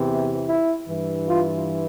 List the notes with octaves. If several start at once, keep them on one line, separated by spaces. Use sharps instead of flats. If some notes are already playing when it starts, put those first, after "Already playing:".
Already playing: E2 C3 E3
E4
G2 E3
F4